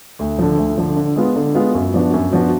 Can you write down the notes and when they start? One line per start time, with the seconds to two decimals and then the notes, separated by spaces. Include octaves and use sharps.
0.19 D2
0.39 D3 F3
0.57 D2
0.78 D3 F3
0.96 D3
1.16 G#3 B3 F4
1.36 D3
1.55 G#3 B3 F4
1.75 F#2
1.94 F3 B3 D4 F#4
2.13 F#2
2.33 F3 B3 D4 F#4